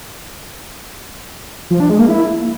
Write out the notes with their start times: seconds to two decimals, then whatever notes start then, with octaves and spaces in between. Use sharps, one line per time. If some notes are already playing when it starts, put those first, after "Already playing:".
1.70 F3
1.80 D4
1.90 G#3
1.99 A#3
2.09 E4